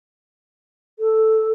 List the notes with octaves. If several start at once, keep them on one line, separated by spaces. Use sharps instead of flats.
A4